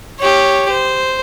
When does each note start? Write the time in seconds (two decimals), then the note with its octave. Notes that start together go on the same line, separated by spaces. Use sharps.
0.19 G4 C#5
0.69 C5